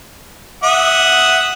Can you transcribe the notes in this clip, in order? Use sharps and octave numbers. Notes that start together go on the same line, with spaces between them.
E5 F#5 D#6